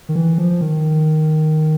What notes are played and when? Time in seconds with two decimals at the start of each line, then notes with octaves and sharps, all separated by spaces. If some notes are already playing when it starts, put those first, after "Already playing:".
0.09 D#3
0.15 E3
0.38 F3
0.61 D#3